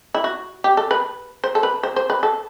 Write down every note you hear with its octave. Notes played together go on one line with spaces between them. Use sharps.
E4
F#4
G4
A4
B4
C5
A4
B4
C5
C5
B4
A4